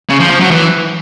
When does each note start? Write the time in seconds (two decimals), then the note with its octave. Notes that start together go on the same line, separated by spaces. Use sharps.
0.09 C#3
0.20 F3
0.30 F3
0.40 F#3
0.51 E3